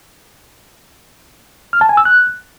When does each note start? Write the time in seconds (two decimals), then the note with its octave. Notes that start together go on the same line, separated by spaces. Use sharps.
1.73 F6
1.81 A5
1.89 G#5
1.97 E6
2.05 F#6